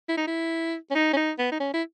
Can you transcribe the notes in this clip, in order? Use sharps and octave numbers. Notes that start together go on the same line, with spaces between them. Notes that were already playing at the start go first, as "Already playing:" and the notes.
E4
D#4
E4
C#4
D#4
C#4
D#4
B3
D#4
C#4
E4